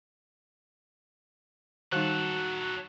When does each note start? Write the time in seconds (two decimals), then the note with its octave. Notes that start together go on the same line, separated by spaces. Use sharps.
1.92 D#3 F#3 G3 D#4 F#4 A4 F#6